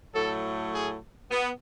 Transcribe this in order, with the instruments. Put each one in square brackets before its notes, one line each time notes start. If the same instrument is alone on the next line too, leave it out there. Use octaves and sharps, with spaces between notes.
[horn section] A2 F#3 A3 A4
G#4
B3